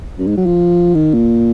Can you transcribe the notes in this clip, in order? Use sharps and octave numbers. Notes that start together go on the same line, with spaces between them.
F#2
G#2
F#3
F3
D#3
A#2